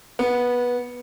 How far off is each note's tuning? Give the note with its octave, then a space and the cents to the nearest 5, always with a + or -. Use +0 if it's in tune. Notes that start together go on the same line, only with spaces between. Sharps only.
B3 -15